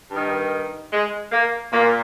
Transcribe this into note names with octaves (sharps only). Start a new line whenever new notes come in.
G2 D#3
G#3
A#3
A#2 A#3